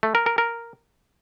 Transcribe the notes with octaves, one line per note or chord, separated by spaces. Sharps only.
A3
A#4
A#4
A#4